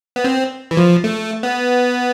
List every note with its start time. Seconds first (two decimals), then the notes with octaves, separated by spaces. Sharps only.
0.16 B3
0.24 C4
0.71 E3
0.77 F3
1.04 A3
1.43 B3